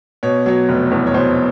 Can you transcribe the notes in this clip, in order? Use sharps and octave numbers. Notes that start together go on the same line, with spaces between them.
B2 C#5
F#3 C#5
F1
E2
C#5
B2 C5